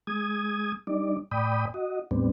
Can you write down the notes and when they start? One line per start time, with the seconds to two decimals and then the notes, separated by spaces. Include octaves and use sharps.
0.07 G#3 D#6 G#6
0.87 G3 D4 D#4 D5
1.31 A2 D5 G5 B5 D#6
1.74 F#4 D#5
2.11 E2 A2 G3 B3 C4 D4